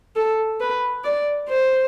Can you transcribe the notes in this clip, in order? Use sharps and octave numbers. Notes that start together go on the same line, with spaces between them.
A4
B4
D5
C5